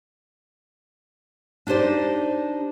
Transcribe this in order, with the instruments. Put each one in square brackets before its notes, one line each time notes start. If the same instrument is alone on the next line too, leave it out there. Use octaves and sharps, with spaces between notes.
[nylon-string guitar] D4 D#4 G4 C5 D5